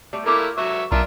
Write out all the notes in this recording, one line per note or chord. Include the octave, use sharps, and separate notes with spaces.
G3 A3
A3 A#3 E4 F4 G4 A4
F#3 B4 E5 C#6
B1 D4 F4 A#4 E5